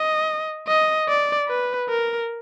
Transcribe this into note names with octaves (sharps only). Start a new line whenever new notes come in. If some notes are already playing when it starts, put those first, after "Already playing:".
Already playing: D#5
D#5
D5
B4
A#4